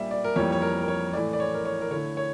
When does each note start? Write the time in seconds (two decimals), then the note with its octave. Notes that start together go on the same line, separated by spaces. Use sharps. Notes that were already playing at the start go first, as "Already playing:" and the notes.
Already playing: A#2 G3 D4 E5
0.11 D5
0.24 A#4
0.36 F2 E3 G3 A#3 C#5
0.52 C#5
0.62 A#4
0.81 A#4
0.88 C#5
1.13 A2 E3 A3 D5
1.33 D5
1.40 C#5
1.54 A#4
1.65 C#5
1.81 A#4
1.91 D3 A3 E4 C#5
2.17 C#5